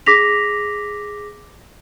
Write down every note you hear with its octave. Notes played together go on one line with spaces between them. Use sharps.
G#4 D6 A#6 B6 F7